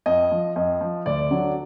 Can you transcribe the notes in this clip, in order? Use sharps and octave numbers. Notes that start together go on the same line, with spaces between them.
F2 D#5
F3
F2 D#5
F3
D2 D5
D3 F#3